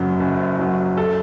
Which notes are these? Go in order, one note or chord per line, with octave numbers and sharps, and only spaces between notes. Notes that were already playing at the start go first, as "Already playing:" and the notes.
Already playing: F#1 F#2 F#3
F#1
F#2 F#3
A4